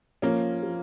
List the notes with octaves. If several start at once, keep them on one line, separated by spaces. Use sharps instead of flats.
F3 A#3 C#4
F3